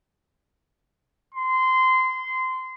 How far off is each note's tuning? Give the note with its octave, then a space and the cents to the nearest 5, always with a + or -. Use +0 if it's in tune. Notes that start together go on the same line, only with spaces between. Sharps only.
C6 -20